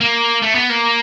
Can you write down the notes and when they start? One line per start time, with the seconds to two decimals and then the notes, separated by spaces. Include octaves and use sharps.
0.01 A#3
0.42 A3
0.55 B3
0.70 A#3